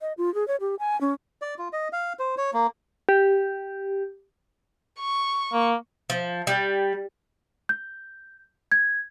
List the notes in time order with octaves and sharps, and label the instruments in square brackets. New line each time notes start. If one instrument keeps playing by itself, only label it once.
[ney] D#5
F4
G#4
C#5
G4
G#5
C#4
[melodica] D5
F4
D#5
F5
C5
C#5
A#3
[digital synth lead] G4
[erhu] C#6
[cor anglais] A#3
[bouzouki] F3
G3
[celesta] G6
G#6